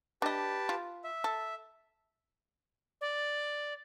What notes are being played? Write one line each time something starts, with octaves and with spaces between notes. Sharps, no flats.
D4 G4 B4 D#5 A5
F4
E5
A4
D5